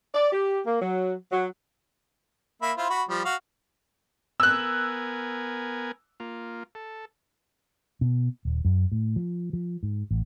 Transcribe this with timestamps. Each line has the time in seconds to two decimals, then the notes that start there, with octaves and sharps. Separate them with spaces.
0.15 D5
0.32 G4
0.67 A#3
0.82 F#3
1.32 F#3
2.62 A#3 E5 B5
2.77 E4 F4 C5
2.90 F#4 B5
3.09 F3 G3
3.25 F#4 F5
4.40 B3 A#4 G#5 E6 F#6
6.20 A#3 F4
6.75 A4
8.01 B2
8.45 D#1
8.65 F#2
8.92 A2
9.16 F3
9.53 F3
9.83 G#2
10.11 A1